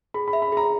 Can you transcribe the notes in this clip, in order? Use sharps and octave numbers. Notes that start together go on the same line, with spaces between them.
G#4 B5
B5
E5
B5
G#4 A#5